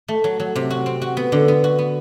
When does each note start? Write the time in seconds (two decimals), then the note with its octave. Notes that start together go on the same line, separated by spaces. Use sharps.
0.08 A3
0.24 F#3
0.40 F#3
0.56 C3
0.71 F#4
0.86 C4
1.02 F#4
1.17 B3
1.32 D3
1.48 B3
1.64 F#4
1.79 B3